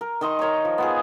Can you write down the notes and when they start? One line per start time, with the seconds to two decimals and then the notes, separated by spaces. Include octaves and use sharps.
0.01 A#4
0.21 D#3 D#5 C6 C#6
0.39 A#4 C#5 G5 A#5
0.65 F3
0.78 B3 F4 G#4